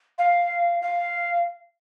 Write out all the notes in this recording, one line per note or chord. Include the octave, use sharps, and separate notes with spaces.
F5
F5